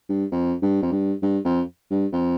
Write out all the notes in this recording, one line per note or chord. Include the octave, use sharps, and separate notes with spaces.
G2
F2
G2
F2
G2
G2
F2
G2
F2